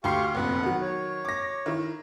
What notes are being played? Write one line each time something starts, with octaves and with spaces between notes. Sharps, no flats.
D2 G4 F5 C6 C#6 C7
F1 A#1 F2 B3 F#5
D#3 F#3
C#5
D6 A#6
D#3 E4